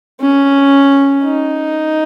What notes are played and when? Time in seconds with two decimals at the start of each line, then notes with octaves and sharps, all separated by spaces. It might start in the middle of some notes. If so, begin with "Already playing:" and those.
0.21 C#4
1.24 D#4